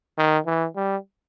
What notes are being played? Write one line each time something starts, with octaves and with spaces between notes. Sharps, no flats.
D#3
E3
G3